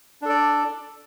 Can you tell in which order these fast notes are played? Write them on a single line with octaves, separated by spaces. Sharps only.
D4 A4 D5